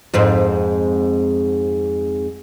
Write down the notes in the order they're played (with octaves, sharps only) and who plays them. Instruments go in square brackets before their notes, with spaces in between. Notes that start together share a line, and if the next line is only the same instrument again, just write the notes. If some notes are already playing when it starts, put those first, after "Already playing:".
[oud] F2 G#2 C4